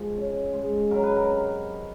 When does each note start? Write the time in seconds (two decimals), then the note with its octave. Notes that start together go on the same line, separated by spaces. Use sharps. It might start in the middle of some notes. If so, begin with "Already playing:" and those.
Already playing: F3 G#3
0.16 C#4
0.53 G#3
0.91 F#3 A#4
1.03 B4
1.16 A#4
1.29 C3